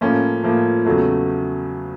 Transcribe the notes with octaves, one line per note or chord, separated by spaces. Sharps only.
A2 F3 A#3 C#4
A2 F3 A#3
E2 C#3 F#3 A3